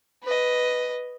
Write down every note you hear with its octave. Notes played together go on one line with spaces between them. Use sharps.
B4 D#5